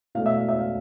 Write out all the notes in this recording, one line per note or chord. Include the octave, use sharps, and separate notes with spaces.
B2 A3 D4 F5
E5
F5
E5
F5